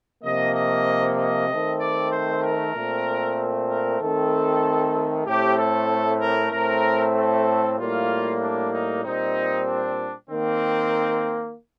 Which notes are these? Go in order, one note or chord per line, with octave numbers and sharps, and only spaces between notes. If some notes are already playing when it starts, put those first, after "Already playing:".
C3 F3 A#3 D#5
D#5
D#5
D#3 A3 C4
D5
C5
A#4
A#2 A3 C4
A#4
D#3 A3 C4 A4
A2 A3 C4 G4
A4
A#4
A2 A3 C4 A#4
A4
A2 G3 A#3 F4
D4
D#4
A#2 G3 C4 D#4
D4
D#3 A#3 C4